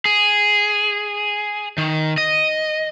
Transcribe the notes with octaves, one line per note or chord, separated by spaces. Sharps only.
G#4
D#3
D#5